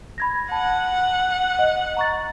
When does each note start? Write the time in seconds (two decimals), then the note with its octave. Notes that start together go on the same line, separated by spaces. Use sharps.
0.18 B5 G#6 A#6
0.52 F#5 A5
1.59 D#5
1.97 A#5 C#6 A6